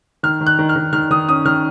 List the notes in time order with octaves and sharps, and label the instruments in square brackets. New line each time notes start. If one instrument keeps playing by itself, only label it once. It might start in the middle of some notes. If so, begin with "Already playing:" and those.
[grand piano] D#3 F6
D#3
F#6
D#3
F6
D#3
D#3 F6
D#3 D#6
C#4 D#6
D#3 F6